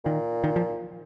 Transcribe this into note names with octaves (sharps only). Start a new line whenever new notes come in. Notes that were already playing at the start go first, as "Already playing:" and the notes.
A#2 D#3
D#3
F3